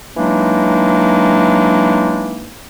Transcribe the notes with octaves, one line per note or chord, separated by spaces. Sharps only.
E3 F#3 G#3 A#3 D4 D#4